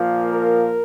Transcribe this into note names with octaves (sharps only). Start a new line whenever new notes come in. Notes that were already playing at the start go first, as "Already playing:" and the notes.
Already playing: A#2 F3 A#3
A#4